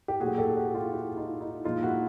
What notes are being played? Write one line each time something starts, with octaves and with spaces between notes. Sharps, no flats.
G4
A#2 F#3 A3 F#4 G#4
G4 A4
F#4 G#4
F4 G4
E4 F#4
E4
D#4 F4
D#4
A#2 F3 G#3 D#4 F4
E4 F#4